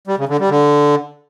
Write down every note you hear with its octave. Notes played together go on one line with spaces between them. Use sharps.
G3
C#3
D3
G3
D3